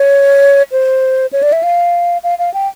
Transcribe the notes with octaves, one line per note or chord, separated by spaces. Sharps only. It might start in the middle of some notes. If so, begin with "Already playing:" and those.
Already playing: C#5
C5
C#5
D5
E5
F5
F5
F5
G5